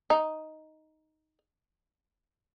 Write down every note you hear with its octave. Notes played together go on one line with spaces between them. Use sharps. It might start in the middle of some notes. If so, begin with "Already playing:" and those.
D#4